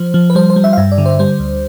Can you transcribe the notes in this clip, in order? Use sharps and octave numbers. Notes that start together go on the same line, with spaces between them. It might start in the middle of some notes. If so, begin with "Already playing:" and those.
Already playing: F3 C5
F3
B4
G3 C5
C5
G3
E5
F5
G2 E5
D5
D3
C5
G3 C5
D2